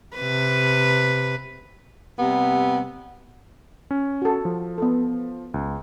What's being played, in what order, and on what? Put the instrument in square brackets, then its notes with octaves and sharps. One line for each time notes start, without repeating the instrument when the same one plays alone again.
[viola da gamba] C3 B4
[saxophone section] C3 G3 B3
[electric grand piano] C#4
[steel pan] F#4 A4
[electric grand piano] F3
[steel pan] B3 A4
[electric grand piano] C#2